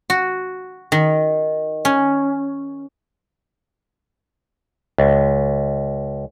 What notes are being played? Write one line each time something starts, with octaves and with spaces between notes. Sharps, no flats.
F#4
D#3
C#4
C#2